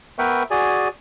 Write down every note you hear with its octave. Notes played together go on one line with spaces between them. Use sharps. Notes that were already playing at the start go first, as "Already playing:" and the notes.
B3 A#4 B4 E5 G5 C#6
F#4 G#4 D5 G#5